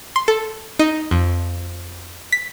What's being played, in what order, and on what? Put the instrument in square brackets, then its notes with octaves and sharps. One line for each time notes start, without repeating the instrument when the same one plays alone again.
[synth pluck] C6
A4
D#4
F2
B6